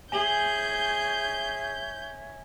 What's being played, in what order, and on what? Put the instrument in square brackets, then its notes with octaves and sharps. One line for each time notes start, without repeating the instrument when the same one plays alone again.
[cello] G#4 [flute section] C#5 E5 [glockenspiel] G#5 F#7 G7 [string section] G6